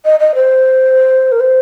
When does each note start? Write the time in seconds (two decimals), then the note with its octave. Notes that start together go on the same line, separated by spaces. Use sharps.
0.05 D#5
0.20 D#5
0.35 C5
1.32 A#4
1.40 C5